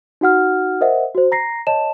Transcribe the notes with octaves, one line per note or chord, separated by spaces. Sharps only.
D#4 F#4 F#5 F6
A#4 C5 D#5 E5 F#5
F#4 C5
A#5 A#6 C7
C#5 D#5 A5 E7